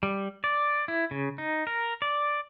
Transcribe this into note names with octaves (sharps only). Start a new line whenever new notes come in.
G3
D5
E4
C#3
D#4
A#4
D5